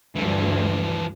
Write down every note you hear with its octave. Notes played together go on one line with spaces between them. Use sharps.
D2 G2 E3 F3